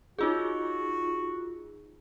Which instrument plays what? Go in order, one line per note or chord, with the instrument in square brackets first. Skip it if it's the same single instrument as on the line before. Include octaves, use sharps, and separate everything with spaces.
[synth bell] D#4 F4 G#4 [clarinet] F#4